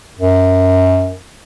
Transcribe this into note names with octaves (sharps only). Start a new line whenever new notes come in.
F#2